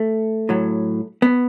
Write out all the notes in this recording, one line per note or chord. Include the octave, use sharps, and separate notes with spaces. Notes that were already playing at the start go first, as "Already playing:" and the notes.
Already playing: A3
A2 F#3
B3